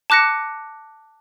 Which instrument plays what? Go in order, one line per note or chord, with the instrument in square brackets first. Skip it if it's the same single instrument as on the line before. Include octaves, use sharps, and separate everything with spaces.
[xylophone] A5 D6 F#6 A#6 C#7